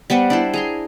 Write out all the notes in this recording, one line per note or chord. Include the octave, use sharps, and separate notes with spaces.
G3 B3 C5 F#5
D4 E4 C5
G#4 A#5 C6